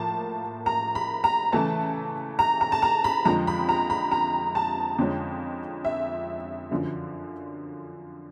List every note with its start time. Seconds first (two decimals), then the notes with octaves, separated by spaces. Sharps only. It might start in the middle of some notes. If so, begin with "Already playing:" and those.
Already playing: A2 F3 A#3 A5
0.66 A#5
0.95 B5
1.24 A#5
1.52 C#3 E3 A3 A5
2.39 A#5
2.61 A#5
2.72 A5
2.82 A#5
3.04 B5
3.25 F2 D3 F3 G#3 A#5
3.47 B5
3.69 A#5
3.90 B5
4.11 A#5
4.55 A5
4.98 F2 D3 F3 G#3 C#4
5.85 E5
6.71 F#2 D3 F3